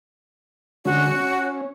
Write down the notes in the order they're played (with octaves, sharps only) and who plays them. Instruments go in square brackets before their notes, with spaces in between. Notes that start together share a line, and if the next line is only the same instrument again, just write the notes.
[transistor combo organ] D3 G#3 C#4 [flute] F#4
[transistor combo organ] C#4